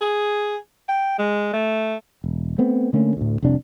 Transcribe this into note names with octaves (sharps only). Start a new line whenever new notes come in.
G#4
G5
G#3
A3
E1
A3 B3 C4
D3 A3 A#3 C#4
D2 A2
F1 C2 C3 D4